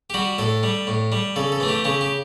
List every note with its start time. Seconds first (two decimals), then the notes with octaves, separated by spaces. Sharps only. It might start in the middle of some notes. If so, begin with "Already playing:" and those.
0.10 G4
0.14 G3 F#4
0.38 A2 A4
0.63 G3
0.87 A2
1.12 G3
1.36 C#3 A4
1.52 A4
1.60 E3 A3
1.68 G4
1.84 C#3 G4
2.01 G4